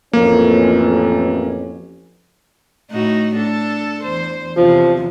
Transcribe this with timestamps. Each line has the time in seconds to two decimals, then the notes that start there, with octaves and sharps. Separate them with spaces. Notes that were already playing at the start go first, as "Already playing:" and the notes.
0.13 A1 F2 A#3 C#4
2.91 A2 D#4 F#4
3.35 D4 A4
4.03 E2 C5
4.57 E2 C3 F3